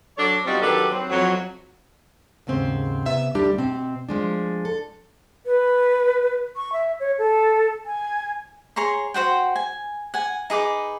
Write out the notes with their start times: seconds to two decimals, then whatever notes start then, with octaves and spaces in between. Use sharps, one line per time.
0.17 F#3 D4 A4 C#5 D5
0.45 B2 G3 C4 D#4 F4 F#4
0.61 D#3 F#3 D4 G4 A4 B4
0.92 F#3 C4
1.10 F2 F#3
2.47 D#2 G#2 C#3 C4
3.06 C3 B3 E5
3.35 D2 G3 D4 G4
3.58 B2 C4
4.09 F3 G#3 D4
4.65 A4
5.45 B4
6.56 C#6
6.73 E5
7.00 C#5
7.18 A4
7.86 G#5
8.76 G#4 C#5 A#5 C6
9.14 F#4 C5 F#5 G5
9.56 G#5
10.14 F#5 G#5
10.50 D#4 G#4 B4 D6